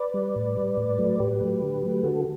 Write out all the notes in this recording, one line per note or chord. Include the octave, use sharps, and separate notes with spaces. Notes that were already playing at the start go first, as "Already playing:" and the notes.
Already playing: B4 D5
G3
A2
G3
A2
F#3 A3
A2 G4 B4
F#3 A3
D3
F#3 A3
D3 F#4 A4